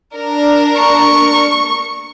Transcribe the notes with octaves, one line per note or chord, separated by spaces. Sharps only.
D4 A#4
C#6